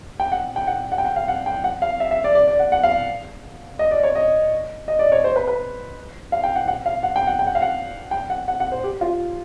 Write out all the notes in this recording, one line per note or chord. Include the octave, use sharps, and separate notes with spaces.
G5
F#5
G5
F#5
F#5
G5
F#5
F5
F#5
G5
F#5
F5
E5
E5
D5
D5
D5
F#5
F#5
F5
D#5
D5
C#5
D#5
D#5
D5
C#5
C5
B4
B4
F5
G5
F#5
F#5
F5
F#5
G5
F#5
G5
F#5
F5
F#5
G5
F#5
F#5
F#5
C5
G4
F4